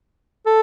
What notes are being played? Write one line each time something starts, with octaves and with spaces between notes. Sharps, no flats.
A4